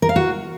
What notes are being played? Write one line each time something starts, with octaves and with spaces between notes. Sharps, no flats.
A#4
F5
F#4